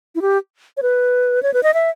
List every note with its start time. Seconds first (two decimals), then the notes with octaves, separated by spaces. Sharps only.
0.15 E4
0.22 G4
0.77 C#5
0.83 B4
1.43 C#5
1.54 B4
1.63 D#5
1.74 E5